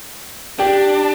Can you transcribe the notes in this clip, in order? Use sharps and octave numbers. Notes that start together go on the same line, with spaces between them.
D4 G4